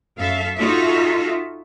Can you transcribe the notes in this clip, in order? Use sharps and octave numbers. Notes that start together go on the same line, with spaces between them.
F#2 A4 E5 F5
D#4 F4 F#4 A4 E5